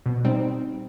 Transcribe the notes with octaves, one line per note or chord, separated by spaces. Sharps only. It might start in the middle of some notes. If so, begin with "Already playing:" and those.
B2
G3 C4 D#4